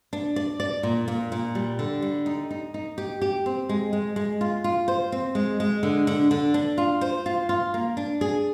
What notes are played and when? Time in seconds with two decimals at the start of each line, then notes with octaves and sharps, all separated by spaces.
0.13 D4
0.36 D5
0.60 D5
0.83 A#2
1.08 A#2
1.32 A#2
1.55 G3
1.79 D3
2.02 G3
2.26 D#4
2.51 D#4
2.74 D#4
2.98 G4
3.21 G4
3.46 C4
3.69 G#3
3.93 G#3
4.16 G#3
4.41 F4
4.64 F4
4.88 C5
5.12 C4
5.35 G#3
5.60 G#3
5.83 D3
6.07 D3
6.31 D3
6.54 D4
6.78 F4
7.01 C5
7.26 F4
7.49 F4
7.74 A#3
7.97 D4
8.21 G#4